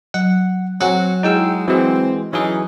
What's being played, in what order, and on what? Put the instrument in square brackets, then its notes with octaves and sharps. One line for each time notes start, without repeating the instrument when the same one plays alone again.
[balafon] F#3 [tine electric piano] F#5
[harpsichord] F#3 [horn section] C4 F#4 [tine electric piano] F#5 [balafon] G#5
[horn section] G#3 [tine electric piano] D#4 G5 E6 [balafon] E4 G#4
[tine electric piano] E3 G#3 [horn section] C4 [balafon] F#4
[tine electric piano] E3 F#3 G#4 [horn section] C#4 D#4